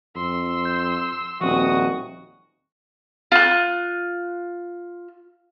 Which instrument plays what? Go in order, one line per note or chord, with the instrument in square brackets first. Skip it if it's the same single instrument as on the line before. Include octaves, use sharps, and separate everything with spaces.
[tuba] F2 [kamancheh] C6 E6
[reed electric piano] G6
[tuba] D#1 [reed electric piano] F3 C4 [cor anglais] F#4 [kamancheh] D#6
[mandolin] F4 F#6